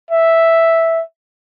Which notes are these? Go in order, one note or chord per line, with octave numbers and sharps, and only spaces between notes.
E5